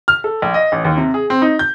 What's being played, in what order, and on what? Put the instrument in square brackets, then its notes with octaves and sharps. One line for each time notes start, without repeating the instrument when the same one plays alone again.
[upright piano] F6
A4
A#1
D#5
A1
D#2
C3
G#4
C4
D#4
G6